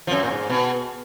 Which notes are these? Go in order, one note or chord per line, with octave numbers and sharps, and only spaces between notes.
F3
F#2
A#2
G#2
B2